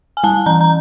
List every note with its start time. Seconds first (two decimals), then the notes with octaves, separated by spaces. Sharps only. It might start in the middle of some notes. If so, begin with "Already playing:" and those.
0.17 G#5
0.24 G3 A5
0.46 E3 A#5
0.61 A#5